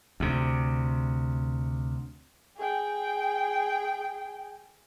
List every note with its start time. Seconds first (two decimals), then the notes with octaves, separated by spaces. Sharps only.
0.20 D2 C3
2.57 G#4 G5